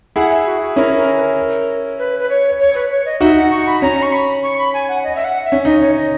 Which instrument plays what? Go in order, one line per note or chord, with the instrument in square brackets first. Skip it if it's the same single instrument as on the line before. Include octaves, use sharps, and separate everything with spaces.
[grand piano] E4 G#4 [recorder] F#5
[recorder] E5
F#4
[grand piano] C#4 E4 [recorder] A#4
[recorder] A#4
B4
A#4
B4
B4
C#5
C#5
B4
C#5
D#5
[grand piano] D#4 F#4 [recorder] E5
[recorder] F#5
C#6
B5
[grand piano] C#4 [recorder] A#5
[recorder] C#6
B5
C#6
B5
G#5
F#5
D#5
E5
F#5
E5
[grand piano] C#4
[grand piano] D#4 [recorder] D#5
[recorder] C#5
D#5